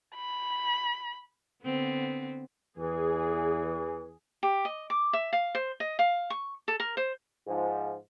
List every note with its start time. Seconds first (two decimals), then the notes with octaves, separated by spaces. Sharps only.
0.15 B5
1.64 D3 B3 C4
2.78 E2 E3 G#4
4.43 G4
4.65 D#5
4.90 D6
5.13 E5
5.33 F5
5.55 C5
5.80 D#5
5.99 F5
6.30 C#6
6.68 A4
6.80 A#4
6.97 C5
7.47 G#2 F3